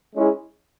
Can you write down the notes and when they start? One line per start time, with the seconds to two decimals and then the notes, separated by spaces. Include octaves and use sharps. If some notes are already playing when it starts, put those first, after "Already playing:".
0.14 G#3 C#4 E4 G#4